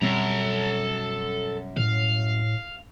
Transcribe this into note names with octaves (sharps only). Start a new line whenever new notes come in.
F#2 B2 G3 C4 A4 A#5
A2 F5